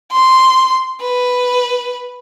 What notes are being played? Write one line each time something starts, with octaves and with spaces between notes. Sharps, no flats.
C6
B4